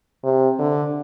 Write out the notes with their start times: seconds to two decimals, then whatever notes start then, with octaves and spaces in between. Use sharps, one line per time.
0.24 C3
0.59 D3